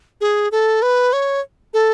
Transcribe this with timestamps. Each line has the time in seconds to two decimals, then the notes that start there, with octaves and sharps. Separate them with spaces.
0.21 G#4
0.52 A4
0.82 B4
1.13 C#5
1.74 A4